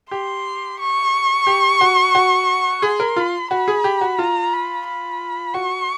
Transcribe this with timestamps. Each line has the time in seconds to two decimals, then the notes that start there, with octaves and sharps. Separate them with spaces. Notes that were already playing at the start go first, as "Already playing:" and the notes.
0.11 G4 C6
0.80 C#6
1.47 G4
1.81 F#4
2.15 F#4
2.82 G#4 C6
3.00 A#4
3.16 F4
3.51 F#4 B5
3.68 G#4
3.84 G4
4.01 F#4
4.19 F4 A#5
4.53 B5
4.86 B5
5.54 F#4 C#6